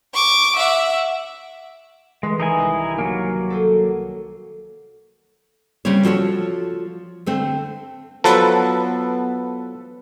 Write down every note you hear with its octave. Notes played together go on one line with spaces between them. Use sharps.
C#6 D6
E5 F#5
E3 G#3 A#4 B4
D#3 G3 D#4 E4 G#5
C2 C5
F#3 A#3
A4 C5 G#5
C#3 G3 C4 C#4 C#5
F3 F#4 A4 C#5
D3 A3 C4
F3 F#3 B3 A4 B4